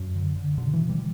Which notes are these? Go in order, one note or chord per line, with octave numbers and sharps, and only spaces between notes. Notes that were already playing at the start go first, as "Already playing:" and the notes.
Already playing: F#2
D3
D3
B2 D3
E3
B2
E3 G3